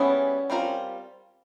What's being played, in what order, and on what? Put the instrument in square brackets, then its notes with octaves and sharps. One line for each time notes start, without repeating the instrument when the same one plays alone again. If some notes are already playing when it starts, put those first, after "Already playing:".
Already playing: [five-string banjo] G3 B3 E4 G#4 [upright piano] C#4
[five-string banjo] G3 C4 F4 A#4